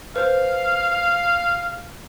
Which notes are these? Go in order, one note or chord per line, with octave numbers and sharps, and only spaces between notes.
B4 C5 F5